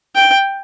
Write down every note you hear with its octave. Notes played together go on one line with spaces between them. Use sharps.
G5